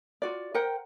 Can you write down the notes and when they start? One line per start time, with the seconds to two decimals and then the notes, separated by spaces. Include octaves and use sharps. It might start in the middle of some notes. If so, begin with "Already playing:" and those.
0.22 F4 F#4 D5
0.54 A#4 C5 F#5 G5